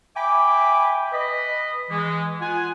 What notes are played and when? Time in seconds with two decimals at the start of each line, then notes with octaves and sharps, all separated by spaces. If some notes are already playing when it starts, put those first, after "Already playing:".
0.16 E5 G5 G#5 B5 D6
1.12 B4 D#5 B5
1.90 E3 G#3
2.41 F4 F#5 G#5